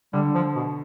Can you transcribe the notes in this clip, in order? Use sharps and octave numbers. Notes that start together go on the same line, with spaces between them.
D3 G3
F3
B2